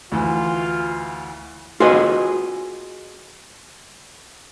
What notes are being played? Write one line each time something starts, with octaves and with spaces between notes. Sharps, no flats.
D2 E3 F4
F4 F#4 G#4 B4 D#5